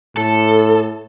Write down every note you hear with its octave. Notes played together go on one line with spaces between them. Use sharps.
A2 A4